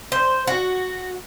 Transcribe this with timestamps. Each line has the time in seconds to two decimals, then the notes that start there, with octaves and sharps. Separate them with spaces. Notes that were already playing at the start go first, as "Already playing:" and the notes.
0.12 C5
0.47 F#4